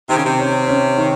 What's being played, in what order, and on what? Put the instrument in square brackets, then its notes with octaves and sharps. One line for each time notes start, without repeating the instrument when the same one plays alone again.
[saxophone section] C3 [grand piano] D#3
[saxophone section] C#3
C3
[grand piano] C#4
C#4
D#3